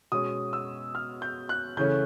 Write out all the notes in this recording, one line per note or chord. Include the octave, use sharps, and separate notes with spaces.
B2 G#3 C#4 D#6
E6
F6
G6
F#6
C#3 E3 A3 C#4 G6